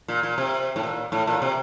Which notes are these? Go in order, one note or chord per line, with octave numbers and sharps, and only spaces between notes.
A#2
A#2
C3
A2
A#2
A2
A#2
C3